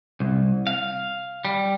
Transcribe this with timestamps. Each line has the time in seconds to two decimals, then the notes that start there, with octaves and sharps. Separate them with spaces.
0.20 C2
0.67 F5
1.45 G3